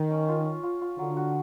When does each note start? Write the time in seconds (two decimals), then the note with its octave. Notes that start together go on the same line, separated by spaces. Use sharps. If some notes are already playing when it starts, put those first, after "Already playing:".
Already playing: D#3
0.10 C#4
0.29 F4
0.46 C#4
0.63 F4
0.81 F4
0.98 D3 F#3
1.17 F#4